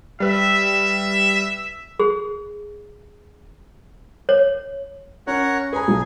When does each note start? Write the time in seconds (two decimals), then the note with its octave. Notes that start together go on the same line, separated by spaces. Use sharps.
0.20 G3 B4 E5
1.99 G#4
4.29 C#5
5.27 C#4 A#4 C#5 F#5
5.73 G#4 B4 A#5
5.88 B1